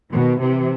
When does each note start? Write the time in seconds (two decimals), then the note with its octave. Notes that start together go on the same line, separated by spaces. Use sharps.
0.12 B2 D#3
0.41 C3 E3